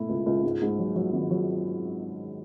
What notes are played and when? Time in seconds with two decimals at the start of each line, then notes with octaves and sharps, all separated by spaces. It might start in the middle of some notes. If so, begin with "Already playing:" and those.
Already playing: B2 A3 E4
0.09 C#2
0.26 C#2
0.43 G#2
0.62 G#2
0.79 F#3
0.96 F#3
1.13 G#1
1.31 F#3